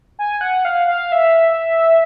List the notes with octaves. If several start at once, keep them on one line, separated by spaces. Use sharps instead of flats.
G#5
F#5
F5
F5
E5